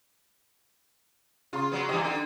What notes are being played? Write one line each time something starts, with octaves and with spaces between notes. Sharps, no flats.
C#3 F4 C6
F#3 B3
G2 E3 G4 D#5
D3 D#4